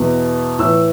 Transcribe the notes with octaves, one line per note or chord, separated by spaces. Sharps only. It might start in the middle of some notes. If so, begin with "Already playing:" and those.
Already playing: E2 B2
A2 E3 E6